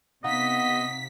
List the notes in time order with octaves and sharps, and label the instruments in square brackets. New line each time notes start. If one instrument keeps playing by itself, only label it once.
[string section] C3 B6 [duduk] B3 [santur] D#4 F5 F#5 [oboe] D#5